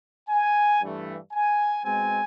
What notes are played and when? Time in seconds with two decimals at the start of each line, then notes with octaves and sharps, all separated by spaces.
0.30 G#5
0.81 G2 E3 A3
1.33 G#5
1.84 B2 G#3 C4 G#5